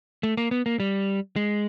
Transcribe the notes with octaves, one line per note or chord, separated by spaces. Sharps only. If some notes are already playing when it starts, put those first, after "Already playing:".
A3
A#3
B3
A#3
G3
G#3